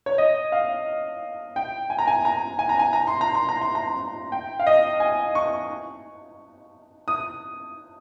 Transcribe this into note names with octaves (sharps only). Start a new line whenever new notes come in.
C#5
D#5
F5
G5
G#5
A#5
G#5
A#5
G#5
A#5
G#5
A#5
C6
A#5
C6
A#5
C6
A#5
G5
F5
D#5
G#5
C#6
D#6